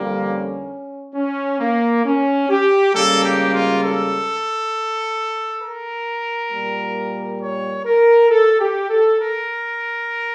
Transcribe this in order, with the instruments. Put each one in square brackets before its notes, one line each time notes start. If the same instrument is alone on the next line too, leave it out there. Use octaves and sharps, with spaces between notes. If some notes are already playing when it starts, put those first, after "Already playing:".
Already playing: [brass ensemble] F2 D3 G3 A#3
C#4
C#4
A#3
C#4
G4
C#2 C#3 G3 A#3 A4
G4
F4
A4
A#4
A#2 G3 A#3
C#5
A#4
A4
G4
A4
A#4